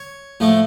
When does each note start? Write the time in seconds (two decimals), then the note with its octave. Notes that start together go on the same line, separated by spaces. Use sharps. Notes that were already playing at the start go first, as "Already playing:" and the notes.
Already playing: C#5
0.40 A2 F3 A3